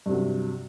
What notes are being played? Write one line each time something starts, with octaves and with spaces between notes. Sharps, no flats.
G2 C3 F#3